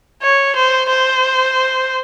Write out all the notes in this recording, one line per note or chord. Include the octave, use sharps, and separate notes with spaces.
C#5
C5
C5